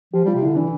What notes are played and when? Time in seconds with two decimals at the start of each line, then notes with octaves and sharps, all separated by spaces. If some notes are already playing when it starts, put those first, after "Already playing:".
0.14 F3 G4
0.25 G3 F4
0.35 C3
0.43 D3 E4
0.56 E3 D4